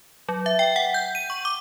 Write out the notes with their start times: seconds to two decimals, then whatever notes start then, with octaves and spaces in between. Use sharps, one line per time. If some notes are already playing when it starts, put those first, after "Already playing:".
0.29 F#3
0.46 E5
0.59 G5
0.76 F#5
0.94 G6
1.15 D#7
1.30 C#6
1.45 D6